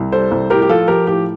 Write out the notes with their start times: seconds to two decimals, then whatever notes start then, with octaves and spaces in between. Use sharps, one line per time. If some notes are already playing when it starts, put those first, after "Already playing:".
Already playing: C2
0.12 G3 A4 C5
0.31 C2
0.50 A2 G4 A#4
0.62 G4
0.69 F3 F4 A4
0.88 F3 G4 A#4
1.07 A2 G4